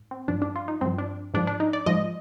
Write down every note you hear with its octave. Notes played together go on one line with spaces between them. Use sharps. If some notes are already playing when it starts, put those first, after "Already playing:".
Already playing: G#2
C4
G2 F3 D4
D4
F4
D#4
G2 F3 C4
D4
G#2 F3 D4
D4
D#4
D5
G#2 F3 D#5